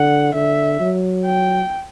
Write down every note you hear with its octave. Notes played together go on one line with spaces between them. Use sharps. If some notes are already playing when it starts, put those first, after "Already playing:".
Already playing: D3 F#5
D3 E5
F#3
G5